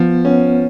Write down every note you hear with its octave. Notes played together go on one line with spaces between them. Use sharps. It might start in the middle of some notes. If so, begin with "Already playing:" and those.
Already playing: F3 B3
B3 C#4